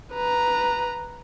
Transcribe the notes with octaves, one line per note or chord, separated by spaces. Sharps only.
B4 A#5